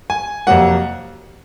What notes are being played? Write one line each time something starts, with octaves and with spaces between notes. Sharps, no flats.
G#5
F2 C3 F#3 A#3 F#5